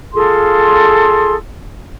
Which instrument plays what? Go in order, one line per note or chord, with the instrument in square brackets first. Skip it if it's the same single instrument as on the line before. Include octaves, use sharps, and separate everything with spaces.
[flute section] F4 G#4 A4 C6